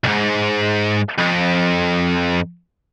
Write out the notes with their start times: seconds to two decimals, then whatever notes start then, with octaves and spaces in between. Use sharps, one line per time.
0.04 B1 G#2
1.19 F2